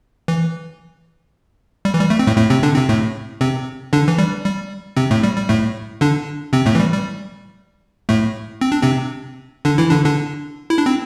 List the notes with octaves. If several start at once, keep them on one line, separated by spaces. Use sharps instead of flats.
E3
G3
E3
G3
A3
C4
A2 A3
A2 A3
C3 C4
D3 D4
C3 C4
A2 A3
C3 C4
D3 D4
E3
G3
G3
C3 C4
A2 A3
G3
G3
A2 A3
D3 D4
C3 C4
A2 A3
E3
G3
G3
A2 A3
C4
D4
C3 C4
D3 D4
E3 E4
D3 D4
D3 D4
E4
D4
C4